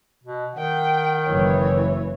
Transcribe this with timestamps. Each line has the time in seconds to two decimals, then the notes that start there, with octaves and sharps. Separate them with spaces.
0.24 B2
0.54 D#3 F#5 G5
1.26 F#1 E3 C#5